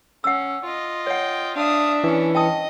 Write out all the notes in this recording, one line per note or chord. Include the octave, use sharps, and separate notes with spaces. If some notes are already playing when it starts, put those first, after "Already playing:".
C#4 F#5 E6
F4 D#5
C#5 F#5 G5
D4 E5 F5 D#6
E3 C#4
D#5 G5 A5 D#6